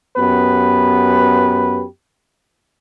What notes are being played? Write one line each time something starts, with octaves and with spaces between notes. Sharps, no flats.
F#2 B3 G4 B4